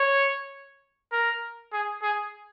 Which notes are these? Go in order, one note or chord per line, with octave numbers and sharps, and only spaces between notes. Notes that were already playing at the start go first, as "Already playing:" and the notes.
Already playing: C#5
A#4
G#4
G#4